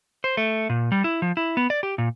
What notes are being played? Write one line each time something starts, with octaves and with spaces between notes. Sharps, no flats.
C5
A3
A#2
G3
E4
F3
E4
B3
D5
G4
A#2